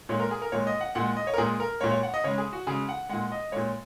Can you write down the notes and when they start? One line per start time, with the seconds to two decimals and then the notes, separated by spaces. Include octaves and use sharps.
0.09 A#2 G#3 C#5
0.20 A#4
0.31 G#4
0.42 A#4
0.52 A#2 G#3 C#5
0.67 D#5
0.81 F#5
0.95 A#2 G#3 F#5
1.17 D#5
1.27 C#5
1.34 A#4
1.38 A#2 G#3 G#4
1.60 A#4
1.81 A#2 G#3 C#5
1.91 C#5
2.03 F#5
2.14 D#5
2.24 C#3 G#3 C#5
2.38 G#4
2.53 F#4
2.67 C#3 G#3 G#4
2.89 F#5
3.09 A#2 G#3 F#5
3.32 D#5
3.52 A#2 G#3 C#5